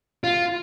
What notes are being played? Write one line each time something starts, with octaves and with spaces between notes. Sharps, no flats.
F4